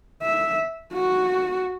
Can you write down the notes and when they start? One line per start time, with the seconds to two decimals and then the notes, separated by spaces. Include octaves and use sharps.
0.22 E5
0.93 F#4